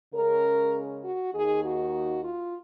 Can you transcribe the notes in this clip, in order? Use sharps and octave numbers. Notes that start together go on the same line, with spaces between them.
C#3 G#3 C#4 A#4
F#4
D#2 D#3 A#3 D#4 G#4
F#4
F4